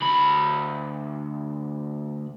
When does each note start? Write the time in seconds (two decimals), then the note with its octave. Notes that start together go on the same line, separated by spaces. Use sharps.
0.01 D2 B5